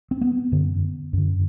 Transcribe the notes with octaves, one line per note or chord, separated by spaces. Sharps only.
C4
B3
F#2 D3
F#2 D3